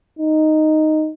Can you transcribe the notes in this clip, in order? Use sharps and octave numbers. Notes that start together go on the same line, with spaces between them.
D#4